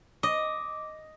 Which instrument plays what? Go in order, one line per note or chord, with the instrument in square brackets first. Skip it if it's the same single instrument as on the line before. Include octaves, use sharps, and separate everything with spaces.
[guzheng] D#5 [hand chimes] D6